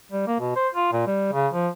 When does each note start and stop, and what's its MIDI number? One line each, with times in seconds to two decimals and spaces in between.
0.12 0.26 55
0.27 0.36 58
0.40 0.54 47
0.56 0.68 72
0.75 0.88 65
0.92 1.02 46
1.07 1.31 55
1.33 1.48 49
1.53 1.68 53